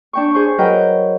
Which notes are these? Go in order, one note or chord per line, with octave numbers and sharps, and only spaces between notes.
D4 G5 C#6
G#4 C5 C#6
F#3 A#4 B4 D#5 G5